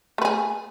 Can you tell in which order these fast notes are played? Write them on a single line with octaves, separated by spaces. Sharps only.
A3 B4 G#4